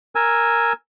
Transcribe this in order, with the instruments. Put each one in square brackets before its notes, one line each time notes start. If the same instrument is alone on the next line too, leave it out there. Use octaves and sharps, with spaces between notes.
[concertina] A#4 G#5 E6